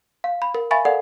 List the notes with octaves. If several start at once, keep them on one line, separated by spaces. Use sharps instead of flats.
F5
B5
A#4
E5 F5 G#5 B5 C#6 A6
A4 A#4 D5 F5 F#5